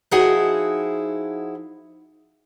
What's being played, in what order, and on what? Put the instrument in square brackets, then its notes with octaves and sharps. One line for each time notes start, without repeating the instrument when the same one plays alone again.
[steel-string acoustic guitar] F3 D#4 E4 F#4 G#4 F#5